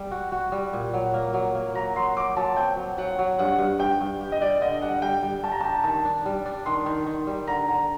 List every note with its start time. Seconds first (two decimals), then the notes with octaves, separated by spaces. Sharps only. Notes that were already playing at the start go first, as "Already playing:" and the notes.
Already playing: G3
0.11 F#4
0.32 F#4
0.52 G3
0.73 A#2
0.93 F#3
1.14 A#3
1.34 F#3
1.55 A#3
1.75 F#3 A#5
1.96 F#3 C6
2.16 F#3 D6
2.36 F#3 A5
2.57 C4 G5
2.77 F#3
2.98 F#3 F#5
3.19 F#3
3.38 G2 F#5
3.59 G2
3.79 G2 G5
4.01 G2
4.20 G4
4.32 D#5
4.40 G3 D5
4.61 D3 D#5
4.81 G3 F#5
5.02 G3 G5
5.23 G3
5.44 D4 A5
5.52 A#5
5.61 G4 A5
5.84 D#3 A5
6.05 D4
6.26 G3
6.46 D4
6.66 D#3 C6
6.86 D#3
7.06 D#3
7.27 G3
7.47 D3 A#5
7.68 D3